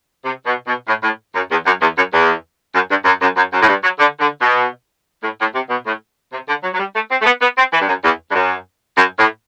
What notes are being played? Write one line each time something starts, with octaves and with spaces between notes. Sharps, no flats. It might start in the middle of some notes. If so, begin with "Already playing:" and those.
C3
B2
B2
A2
A2
F#2
E2
F#2
E2
F#2
E2
F#2
G2
F#2
F#2
F#2
F#2
A2
G2
F#3
D3
D3
B2
A2
A2
C3
B2
A2
C3
D3
F#3
F#3
G3
A3
C4
A3
B3
B3
C4
E3
G2
F#2
E2
G2
F#2
F#2
A2